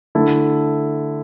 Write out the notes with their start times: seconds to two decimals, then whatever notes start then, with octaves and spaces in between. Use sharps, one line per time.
0.15 D3 A3 E4 A4